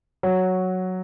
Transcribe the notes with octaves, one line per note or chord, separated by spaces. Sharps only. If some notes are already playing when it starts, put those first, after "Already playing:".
F#3